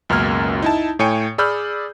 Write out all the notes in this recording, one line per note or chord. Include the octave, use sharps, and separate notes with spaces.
C#2 F#2 B2 A#3 F6 G#6
D#4 E4 A5
A2 C#5 G5 G#5 C#7
G#4 D5 B5 E6 F6 G6